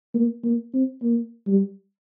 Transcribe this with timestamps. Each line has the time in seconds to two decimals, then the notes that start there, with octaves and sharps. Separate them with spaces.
0.15 A#3
0.44 A#3
0.74 C4
1.03 A#3
1.47 G3